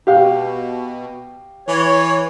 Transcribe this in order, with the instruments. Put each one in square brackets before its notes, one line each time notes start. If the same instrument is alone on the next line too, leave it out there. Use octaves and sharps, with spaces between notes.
[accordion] B2 [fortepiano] G4 F5
[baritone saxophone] E3 [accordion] C#5